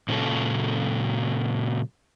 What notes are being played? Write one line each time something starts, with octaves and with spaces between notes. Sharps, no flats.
A#2 C#3 F#3 A4